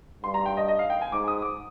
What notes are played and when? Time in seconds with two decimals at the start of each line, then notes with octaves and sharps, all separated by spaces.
0.23 G2 C6
0.34 A#5
0.46 G5
0.57 D#5
0.68 D#5
0.79 F5
0.90 G5
1.02 G#5
1.12 G#2 D6
1.28 D#6
1.42 D6